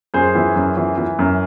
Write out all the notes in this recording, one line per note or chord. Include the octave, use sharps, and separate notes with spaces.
F#2 G#4 C5
E3
F#2
E3
E3
F#2